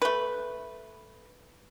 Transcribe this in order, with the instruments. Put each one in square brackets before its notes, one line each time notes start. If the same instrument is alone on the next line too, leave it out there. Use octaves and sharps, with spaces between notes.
[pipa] A3 B4